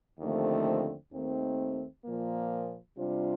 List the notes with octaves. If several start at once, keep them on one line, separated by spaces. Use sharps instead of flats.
D#2 D3 F3 A3 C4
D#2 D#3 A3 C4
A#2 F3 A#3
C3 G3 D4 F4 C5